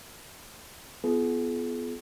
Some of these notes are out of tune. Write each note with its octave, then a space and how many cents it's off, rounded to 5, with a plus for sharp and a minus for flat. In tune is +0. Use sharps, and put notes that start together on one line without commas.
B3 +15 F4 -20 G#4 +35